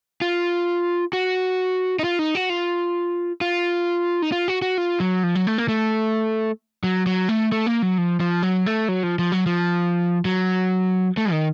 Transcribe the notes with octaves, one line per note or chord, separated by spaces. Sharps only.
F4
F#4
D#4
F4
D#4
F#4
F4
F4
D#4
F4
F#4
F#4
F4
F#3
F3
F#3
A3
A#3
A3
F#3
F#3
A3
A3
A#3
F#3
F3
F3
F#3
A3
F#3
F3
F3
F#3
F3
F#3
A3
D#3